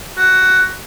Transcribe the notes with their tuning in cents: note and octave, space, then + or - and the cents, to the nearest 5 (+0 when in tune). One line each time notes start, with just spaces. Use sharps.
F#4 +10